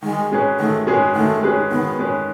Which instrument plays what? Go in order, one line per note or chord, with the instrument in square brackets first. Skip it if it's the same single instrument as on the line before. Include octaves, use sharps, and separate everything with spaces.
[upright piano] D#3 [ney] G#3
[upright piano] G#3 C#4 G#4 B4
[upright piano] D#3 [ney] A3
[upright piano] G#3 C#4 G#4 B4
[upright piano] D#3 [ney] A3
[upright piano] G#3 C#4 G#4 B4
[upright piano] D#3 [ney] B3
[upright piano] G#3 C#4 G#4 B4